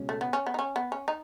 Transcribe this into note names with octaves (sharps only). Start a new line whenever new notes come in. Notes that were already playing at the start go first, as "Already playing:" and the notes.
Already playing: C#2 B2 G#3 C#4
A3
B3
C#4
B3
D#4
C#4
B3
C#4
D#4